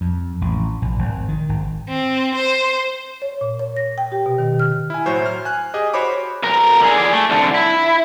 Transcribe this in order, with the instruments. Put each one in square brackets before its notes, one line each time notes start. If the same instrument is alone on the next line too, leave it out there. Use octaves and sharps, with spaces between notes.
[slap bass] F2
A1
A#1
G#1
D#3
G#1
[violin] C4
C5
[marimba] C#5
A#2
C#5
A#6
G5
G4
B2
D#3
F6
[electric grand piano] E4 G#5
A2 F#3 F#4 C5 C#5
F6
G#5 F#6
G4 G#4 D#5 G#5
F#4 C5 C#5 B5 D6
[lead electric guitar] B1 A#4
D3 G#4
G#4 D5
A3
C2 D3
E4